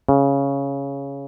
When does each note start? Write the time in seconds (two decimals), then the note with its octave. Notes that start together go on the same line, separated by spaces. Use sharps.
0.09 C#3